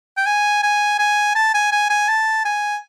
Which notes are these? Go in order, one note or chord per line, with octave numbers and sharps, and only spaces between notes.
G5
G#5
G#5
G#5
A5
G#5
G#5
G#5
A5
G#5